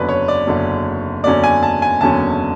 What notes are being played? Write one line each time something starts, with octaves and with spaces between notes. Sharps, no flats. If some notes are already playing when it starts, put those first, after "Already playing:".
Already playing: F#1 E2 D3 F#3 C#4 B4 D5
C#5
D5
F#1 E2 D3 F#3 C#4
F#1 E2 D3 F#3 C#4 D5
G#5
A5
G#5
F#1 E2 D3 F#3 C#4 A5